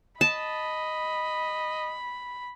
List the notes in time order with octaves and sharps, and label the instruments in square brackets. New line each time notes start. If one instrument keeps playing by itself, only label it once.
[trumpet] D#5 [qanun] A5 [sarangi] B5